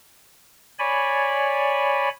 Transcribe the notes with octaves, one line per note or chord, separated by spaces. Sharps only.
C#5 D5 G#5 B5